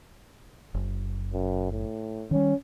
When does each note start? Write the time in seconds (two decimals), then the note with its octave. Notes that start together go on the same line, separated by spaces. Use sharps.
0.74 F#1
1.33 F#2
1.71 A2
2.31 D#3 G3 C#4